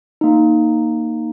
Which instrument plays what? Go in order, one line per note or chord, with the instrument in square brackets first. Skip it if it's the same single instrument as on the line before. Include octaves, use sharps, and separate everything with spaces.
[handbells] A#3 D#4